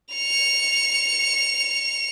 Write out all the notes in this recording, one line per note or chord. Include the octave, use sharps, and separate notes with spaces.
C#7 F7